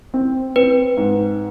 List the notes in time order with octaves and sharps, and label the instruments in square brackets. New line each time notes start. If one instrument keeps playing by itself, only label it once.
[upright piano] C4
[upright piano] C4 [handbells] B4
[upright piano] G#2